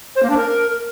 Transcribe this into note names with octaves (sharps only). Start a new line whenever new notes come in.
C5
A#3
D4
A#4